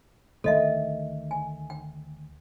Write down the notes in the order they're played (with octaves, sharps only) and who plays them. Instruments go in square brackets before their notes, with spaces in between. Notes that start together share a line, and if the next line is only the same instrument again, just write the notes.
[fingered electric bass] D2 D#3 A3 [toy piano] A4 D#5 E5
[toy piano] G#5
G5